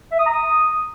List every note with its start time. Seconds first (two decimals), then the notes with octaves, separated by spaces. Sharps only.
0.12 E5
0.19 D#6
0.26 A#5
0.33 D#6